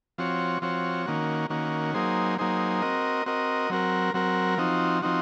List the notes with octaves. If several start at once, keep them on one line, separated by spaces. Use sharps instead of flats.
F3 C4 F#4 C#5
F3 C4 F#4 C#5
D#3 A#3 C#4 F#4
D#3 A#3 C#4 F#4
F#3 A#3 D#4 G#4 C5
F#3 A#3 D#4 G#4 C5
C4 F#4 A#4 D#5
C4 F#4 A#4 D#5
F#3 C4 F#4 A#4
F#3 C4 F#4 A#4
F3 C4 D#4 F#4
F3 C4 D#4 F#4